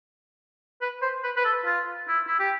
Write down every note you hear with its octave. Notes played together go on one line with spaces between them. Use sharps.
B4
C5
B4
B4
A4
F4
E4
E4
G4